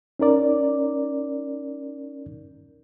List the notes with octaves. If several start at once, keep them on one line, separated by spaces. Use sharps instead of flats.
C#4 D#4 A#4 D5